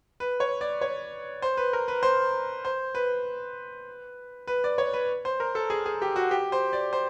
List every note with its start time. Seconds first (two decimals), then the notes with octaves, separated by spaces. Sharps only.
0.20 B4
0.40 C#5
0.61 D5
0.81 C#5
1.42 C5
1.57 B4
1.73 A#4
1.88 B4
2.03 C5
2.65 C5
2.95 B4
4.47 B4
4.64 D5
4.78 C#5
4.94 B4
5.25 C5
5.40 A#4
5.55 A4
5.70 G#4
5.86 G#4
6.02 G4
6.16 F#4
6.31 G4
6.52 C5
6.73 D5
6.93 C5